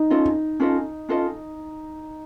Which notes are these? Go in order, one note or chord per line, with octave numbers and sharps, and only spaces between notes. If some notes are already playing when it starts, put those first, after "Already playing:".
Already playing: D#4
C#4 F4 A4 D#5
C#4 F4 A4 D#5
C#4 F4 A4 D#5